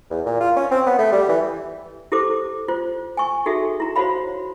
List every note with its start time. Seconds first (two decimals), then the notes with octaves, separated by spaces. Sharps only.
0.10 E2
0.26 A#2
0.40 F4
0.57 C#4
0.71 C4
0.86 B3
0.99 A3
1.12 G3
1.29 E3
2.12 E4 G4 A4 C5 D6
2.68 F4 C5
3.17 G#5 C#6
3.46 D#4 F#4 G#4 A4 E5
3.80 E4 A#5
3.96 F#4 C5 C#5 F5 B5